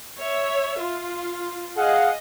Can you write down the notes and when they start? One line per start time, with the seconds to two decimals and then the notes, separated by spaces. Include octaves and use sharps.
0.19 C#5 E5
0.79 F4
1.78 G#4 D#5 F5 F#5